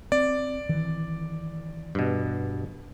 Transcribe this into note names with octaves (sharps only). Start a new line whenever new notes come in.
C4 D5
D#3 E3
G2 B2